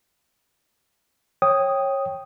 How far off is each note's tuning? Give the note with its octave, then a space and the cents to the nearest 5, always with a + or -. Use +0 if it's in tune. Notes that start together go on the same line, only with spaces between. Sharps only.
C#5 -20 G5 +0 D#6 +0